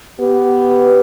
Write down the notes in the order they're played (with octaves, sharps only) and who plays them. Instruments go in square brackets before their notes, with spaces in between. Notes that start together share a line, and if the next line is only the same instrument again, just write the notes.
[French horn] B3 [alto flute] G4